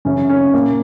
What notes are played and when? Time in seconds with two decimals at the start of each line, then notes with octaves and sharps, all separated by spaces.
0.05 F#2 C#3 E3 C#4
0.30 C#4
0.54 A#2 A#3